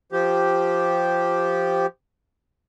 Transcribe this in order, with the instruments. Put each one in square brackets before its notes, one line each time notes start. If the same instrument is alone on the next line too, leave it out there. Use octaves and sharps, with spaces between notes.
[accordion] F3 G4